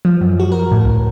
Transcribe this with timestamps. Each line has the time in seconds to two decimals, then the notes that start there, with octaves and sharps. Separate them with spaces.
0.05 F3
0.21 F#2
0.40 F#4
0.52 A#4
0.71 A2
0.84 C#2